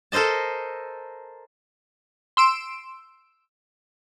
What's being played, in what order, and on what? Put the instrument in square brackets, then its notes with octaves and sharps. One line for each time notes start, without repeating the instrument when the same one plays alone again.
[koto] A4 A#4 C5 D#5 A5
[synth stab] C6 E6 D7 E7